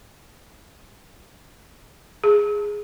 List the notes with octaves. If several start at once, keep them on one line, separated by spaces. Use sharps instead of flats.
G#4